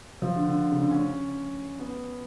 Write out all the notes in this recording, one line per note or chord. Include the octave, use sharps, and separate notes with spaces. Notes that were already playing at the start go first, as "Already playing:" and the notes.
F3
D3
D3
C#3
D3
C#4
B3